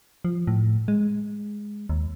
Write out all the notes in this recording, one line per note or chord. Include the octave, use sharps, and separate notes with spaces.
F3
A2
G#3
D#2